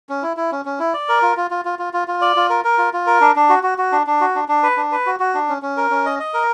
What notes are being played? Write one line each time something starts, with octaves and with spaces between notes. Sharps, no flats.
C#4
E4
E4
C#4
C#4
E4
D5
A#4
F4
F4
F4
F4
F4
F4
F4
D5
F4
A#4
A#4
F4
F4
A#4
D4
D4
F#4
F#4
F#4
D4
D4
F#4
D4
D4
B4
D4
B4
F#4
F#4
D4
C#4
C#4
A#4
C#4
D#5
D#5
A#4